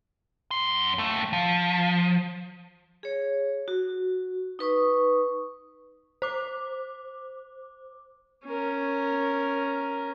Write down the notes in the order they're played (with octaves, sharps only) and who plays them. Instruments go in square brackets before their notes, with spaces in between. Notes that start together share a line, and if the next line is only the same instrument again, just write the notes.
[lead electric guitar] F#2 C6
D#2 A3
F3
[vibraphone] G#4 C#5
F#4
D#4 B4 C#6 D#6
[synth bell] C5 D6
[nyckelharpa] C#4 A#4